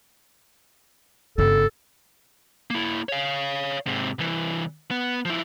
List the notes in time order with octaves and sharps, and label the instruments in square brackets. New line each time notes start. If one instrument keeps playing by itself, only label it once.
[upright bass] G1 C#3 [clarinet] A4
[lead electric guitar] A#3 E4
C#5 F5
G#2 C3
C2 E3
B3
F3 E4